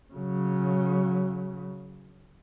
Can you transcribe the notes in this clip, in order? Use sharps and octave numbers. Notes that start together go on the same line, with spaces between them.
C#3 F#3